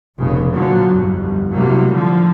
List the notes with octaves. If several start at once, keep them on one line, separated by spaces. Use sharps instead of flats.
F1 A#1 F2 C#3
A#2 D3 F3 F#3
G1 C2 F2
A2 C3 F#3 G3 A#3
D3 F3